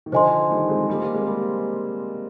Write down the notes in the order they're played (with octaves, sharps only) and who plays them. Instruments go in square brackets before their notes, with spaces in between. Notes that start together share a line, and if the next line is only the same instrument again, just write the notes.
[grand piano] D#3
[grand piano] D3 F3 [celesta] C5 D#5 G#5 C6
[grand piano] D#3 G3
G#3 C4
G3 A#3
G3 A#3
G#3 C4
G3 A#3